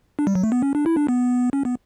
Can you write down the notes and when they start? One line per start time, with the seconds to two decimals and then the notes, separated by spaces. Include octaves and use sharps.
0.19 D4
0.27 G3
0.35 F#3
0.43 A3
0.52 B3
0.63 C#4
0.75 D4
0.86 E4
0.97 D4
1.08 B3
1.53 C#4
1.65 B3